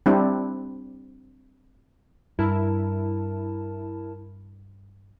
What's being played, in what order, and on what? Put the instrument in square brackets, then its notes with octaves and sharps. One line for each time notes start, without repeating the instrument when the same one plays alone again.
[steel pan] G3 C4 D4 E4
[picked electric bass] G2 [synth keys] E4 A#4 A5